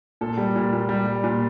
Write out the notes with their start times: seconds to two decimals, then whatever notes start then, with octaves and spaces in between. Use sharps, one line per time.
0.21 A#2 A4
0.37 G3
0.56 A#2
0.73 A#2
0.89 G3
1.06 G3
1.24 A#2